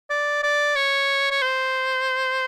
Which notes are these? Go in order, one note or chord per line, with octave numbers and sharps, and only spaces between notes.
D5
D5
C#5
C#5
C5